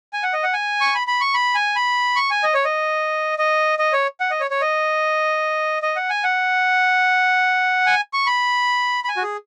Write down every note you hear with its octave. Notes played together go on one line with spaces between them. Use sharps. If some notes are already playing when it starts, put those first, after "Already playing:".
G#5
F#5
D#5
F#5
G#5
C#6
B5
B5
C#6
B5
G#5
B5
C#6
G#5
D#5
C#5
D#5
D#5
D#5
C#5
F#5
D#5
C#5
C#5
D#5
D#5
F#5
G#5
F#5
G#5
C#6
B5
B5
G#5
F#4
G#4